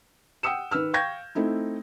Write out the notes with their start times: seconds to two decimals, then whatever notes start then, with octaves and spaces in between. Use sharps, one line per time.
0.43 F#5 G5 D#6 E6 C#7 E7
0.71 D#3 B4 E6 F6
0.93 F5 G5 C#6 G6 G#6 A#6
1.35 A3 C4 D#4 E4